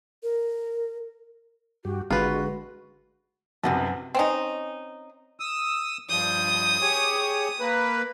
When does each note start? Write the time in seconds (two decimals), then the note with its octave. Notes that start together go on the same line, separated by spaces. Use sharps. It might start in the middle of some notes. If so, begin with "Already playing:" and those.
0.23 A#4
1.85 G2 F#4 G4
2.11 G#1 D3 G#3 F4 F#4 B4
3.64 B1 F#2 C3 E3 F#4 A5
4.15 C4 C#4 D#4
5.40 D#6 E6
6.10 G2 F3 D#6 G6
6.81 G4 G#4 C#5
7.60 A#3 B4